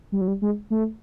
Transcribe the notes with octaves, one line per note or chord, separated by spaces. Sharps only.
G3
F#3
G3
G#3
A3